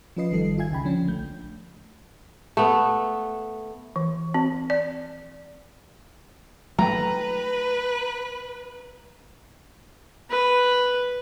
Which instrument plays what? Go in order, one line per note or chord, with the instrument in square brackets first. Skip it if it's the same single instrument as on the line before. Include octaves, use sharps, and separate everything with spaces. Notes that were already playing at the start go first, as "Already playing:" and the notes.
[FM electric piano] F3 C#4 F4 B4 D#5 C7
G#1 D#3 G3 A4 C7
F4 E5 G#5 G#6
C#2 C#3 G5 B5
D3 F3 C#4 D4
A#1 A3 G6
[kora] A3 B3
[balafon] E3
C4
D5
[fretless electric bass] F#3 A3 [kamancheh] B4 [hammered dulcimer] A#5
[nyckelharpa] B4